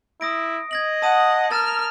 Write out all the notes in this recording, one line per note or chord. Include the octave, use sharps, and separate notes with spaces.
E4 D#6 A#6 D7
D#5 G#6 A#6 F#7
F#5 A5 D#6 D#7
A#4 F6 A6 E7